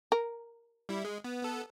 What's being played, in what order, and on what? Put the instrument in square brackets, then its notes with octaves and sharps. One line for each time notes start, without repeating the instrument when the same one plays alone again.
[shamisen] A#4
[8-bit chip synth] G3 E4
G#3
B3
B3 A4